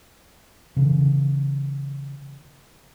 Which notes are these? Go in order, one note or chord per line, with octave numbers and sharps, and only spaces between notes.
C#3 E3